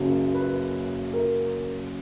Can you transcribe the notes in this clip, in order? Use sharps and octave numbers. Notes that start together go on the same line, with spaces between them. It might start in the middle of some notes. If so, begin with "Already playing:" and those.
Already playing: F#1 F#2 C#3 F#3
B4
A#4